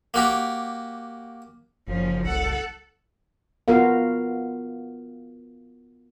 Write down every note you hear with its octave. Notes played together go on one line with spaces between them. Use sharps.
A#3 F#4 G4
F#1 F3 C#4
C2 A4 F#5
B3 F4 F#4 A#4 F5